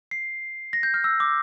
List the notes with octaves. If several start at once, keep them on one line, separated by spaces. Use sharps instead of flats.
C7
A#6
G6
F6
E6
D6